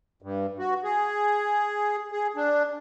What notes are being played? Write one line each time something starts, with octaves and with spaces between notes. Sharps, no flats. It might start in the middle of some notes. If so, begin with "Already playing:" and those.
G2
F#4
G#4
G#4
D4